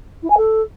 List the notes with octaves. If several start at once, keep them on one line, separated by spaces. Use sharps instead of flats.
E4
G#5
A4